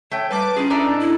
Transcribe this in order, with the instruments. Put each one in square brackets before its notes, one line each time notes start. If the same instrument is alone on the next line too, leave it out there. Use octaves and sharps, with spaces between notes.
[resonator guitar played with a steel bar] A3 G5 [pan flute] C#5
[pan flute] G3 [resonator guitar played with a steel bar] A#3 [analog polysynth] B4 A5 D6
[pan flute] C#4 [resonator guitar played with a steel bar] D#4 F4 G#4
[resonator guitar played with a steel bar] A2 D5 A#5 [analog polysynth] D4 D#4 A4
[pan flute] E4